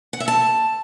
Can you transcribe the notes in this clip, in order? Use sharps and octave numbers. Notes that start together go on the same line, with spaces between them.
F#5
E5
A5